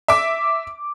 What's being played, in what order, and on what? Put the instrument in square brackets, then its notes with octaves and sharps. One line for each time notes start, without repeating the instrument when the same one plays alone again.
[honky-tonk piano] E5 D6